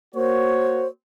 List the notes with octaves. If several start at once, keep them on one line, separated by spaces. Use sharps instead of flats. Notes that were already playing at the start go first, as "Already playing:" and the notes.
A#3 F#4 C5 C#5